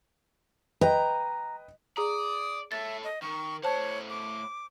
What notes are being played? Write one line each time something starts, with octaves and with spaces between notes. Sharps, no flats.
B4 D#5 G5 A#5
G#4 D5 A#5 D#6
A4 C#5 E5 A6
D#5
D#3 C#6
A2 C5 C#5 F#5 A5
D6